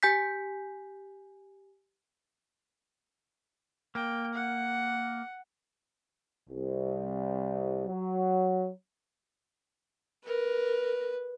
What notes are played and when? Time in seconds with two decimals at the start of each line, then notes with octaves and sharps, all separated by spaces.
0.03 G4 G#5 G6 B6
3.95 A#3 G5
4.34 F#5
6.50 C2
7.86 F#3
10.26 A#4 B4